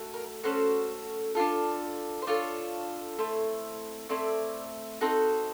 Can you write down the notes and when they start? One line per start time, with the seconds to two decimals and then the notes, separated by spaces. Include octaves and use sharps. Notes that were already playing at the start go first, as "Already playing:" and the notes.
Already playing: A3 F#4
0.14 A#4
0.44 A3 C#4 F#4 A4 C5
1.35 D4 F4 A4
2.22 C5
2.27 D4 F4 A4 C#5
3.19 A3 C4 E4
4.09 A3 C4 E4 D5
5.01 C4 D#4 F#4 A4